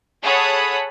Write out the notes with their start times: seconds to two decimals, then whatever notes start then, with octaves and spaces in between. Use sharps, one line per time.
0.23 G#4 A4 C#5 F#5 B5 D#6